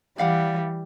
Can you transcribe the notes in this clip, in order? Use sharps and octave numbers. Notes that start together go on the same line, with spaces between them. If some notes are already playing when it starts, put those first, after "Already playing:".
E3 G3 D5 F5 F#5